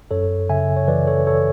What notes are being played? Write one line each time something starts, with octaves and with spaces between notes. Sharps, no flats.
F#2 A4 C#5
C#3 E5 G#5
C#5
E3 B4 D5
A4 C#5
G#1 A4 C#5